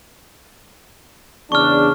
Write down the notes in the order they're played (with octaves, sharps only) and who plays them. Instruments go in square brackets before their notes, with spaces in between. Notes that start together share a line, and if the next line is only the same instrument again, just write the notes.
[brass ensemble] E2 C#3 D4 [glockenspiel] C#6 F6